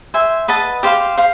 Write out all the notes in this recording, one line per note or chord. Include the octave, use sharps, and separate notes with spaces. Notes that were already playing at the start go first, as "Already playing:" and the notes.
C5 E5 G#5
B4 D#5 F#5 A5
G4 C5 F5
C5 F5